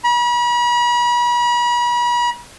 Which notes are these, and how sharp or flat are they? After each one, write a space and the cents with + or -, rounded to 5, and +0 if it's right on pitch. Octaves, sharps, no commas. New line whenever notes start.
B5 -40